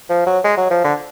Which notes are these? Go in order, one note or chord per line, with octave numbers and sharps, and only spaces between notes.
F3
F#3
G#3
F#3
F3
D3